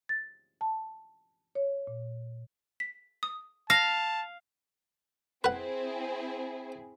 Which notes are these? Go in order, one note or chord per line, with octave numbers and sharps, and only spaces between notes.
A6
A5
C#5
A#2
B6
D#6
F5 A5 A#6
C4 E4 G#4 B4 F#5